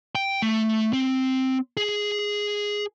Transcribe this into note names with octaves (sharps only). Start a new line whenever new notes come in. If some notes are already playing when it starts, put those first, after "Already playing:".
G5
A3
C4
G#4